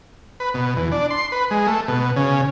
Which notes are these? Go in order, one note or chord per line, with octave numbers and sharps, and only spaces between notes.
B4
B2
E2
D4
C6
B4
G#3
A3
B2
C#3